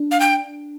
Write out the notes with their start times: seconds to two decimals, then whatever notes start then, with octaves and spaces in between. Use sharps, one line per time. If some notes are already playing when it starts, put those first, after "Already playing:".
Already playing: D4
0.11 F5
0.20 G5